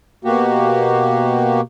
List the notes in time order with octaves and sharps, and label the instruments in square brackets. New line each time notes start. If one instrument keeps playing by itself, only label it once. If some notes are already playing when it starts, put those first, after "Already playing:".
[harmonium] B2 A#3 F#4 G4